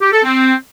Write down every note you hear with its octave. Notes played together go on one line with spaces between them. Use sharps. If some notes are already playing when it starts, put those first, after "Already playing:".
G4
A4
C4